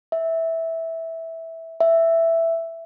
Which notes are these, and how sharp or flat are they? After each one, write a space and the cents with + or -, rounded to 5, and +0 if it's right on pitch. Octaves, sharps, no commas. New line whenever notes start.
E5 -10
E5 +5